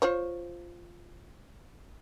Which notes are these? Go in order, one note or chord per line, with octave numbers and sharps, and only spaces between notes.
F4 C5 C#5